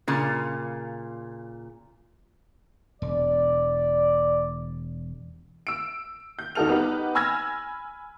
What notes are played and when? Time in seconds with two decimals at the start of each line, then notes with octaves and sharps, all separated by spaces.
0.08 A#2 C#3
3.02 E1 D5
5.67 E6 D7
6.39 G6
6.55 E2 D#4 F#4 A4 F6 F7
6.69 B3 D#4 G4 B4
7.15 G#5 B5 E6 F6 G#6 A#6